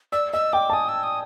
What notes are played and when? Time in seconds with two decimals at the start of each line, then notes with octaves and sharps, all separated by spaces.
0.12 D5 E6
0.33 D#5 E6
0.53 G5 D6
0.70 A5
0.73 G#5 D#6
0.89 E6
1.03 D#6